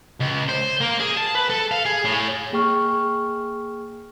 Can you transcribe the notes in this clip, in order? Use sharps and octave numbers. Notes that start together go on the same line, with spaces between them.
C#2
C5
A#3
G#4
A5
B4
A4
F5
G#4
A2
A#3 G#4 G5 C#6 F6